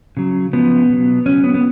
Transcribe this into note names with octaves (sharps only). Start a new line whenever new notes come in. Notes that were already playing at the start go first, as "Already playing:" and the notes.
C#3 F#3
C#3 F3 B3
B2 F#3
C#3 F#3 C#4
B3
B3